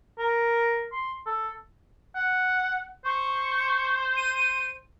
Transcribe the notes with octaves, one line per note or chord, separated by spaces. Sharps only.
A#4
C6
A4
F#5
C5 C#6
D#7